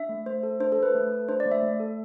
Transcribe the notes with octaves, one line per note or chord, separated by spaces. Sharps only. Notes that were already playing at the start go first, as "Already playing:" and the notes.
Already playing: D4 E5
A3
A3 C5
A4
D4 C5
A4
A3 B4
A3
A4
D4 C5
D5
A3
E5
A3
A4